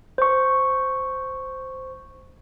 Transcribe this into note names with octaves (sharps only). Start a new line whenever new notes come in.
C5 C#6